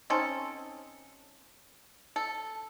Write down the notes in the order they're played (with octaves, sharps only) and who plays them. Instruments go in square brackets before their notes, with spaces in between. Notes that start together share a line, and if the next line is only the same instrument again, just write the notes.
[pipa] C4 C#4 D#4 A4
A4